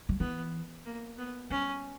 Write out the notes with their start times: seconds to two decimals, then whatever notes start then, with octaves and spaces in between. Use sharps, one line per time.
0.09 F#3
0.20 E3 B3
0.85 A#3
1.18 B3
1.50 G3 C#4